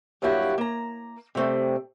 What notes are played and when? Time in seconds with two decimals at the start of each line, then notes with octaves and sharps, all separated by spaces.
0.22 G2 F#3 A#3 E4 F#4 G4
0.58 A#3 A#5
1.35 C3 G3 A3 C4